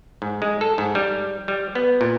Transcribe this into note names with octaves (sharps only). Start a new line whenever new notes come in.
G#2
G#3
A4
G#2
G3
G3
B3
A#2